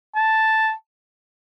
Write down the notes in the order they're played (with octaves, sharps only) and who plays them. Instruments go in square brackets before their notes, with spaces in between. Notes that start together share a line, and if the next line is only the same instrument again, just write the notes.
[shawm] A5